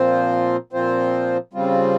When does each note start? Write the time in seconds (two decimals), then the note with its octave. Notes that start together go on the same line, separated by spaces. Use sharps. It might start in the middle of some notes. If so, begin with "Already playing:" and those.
Already playing: A#2 F3 C4 F4 C5
0.73 A#2 F3 C4 F4 C5
1.53 C#3 G3 C4 F4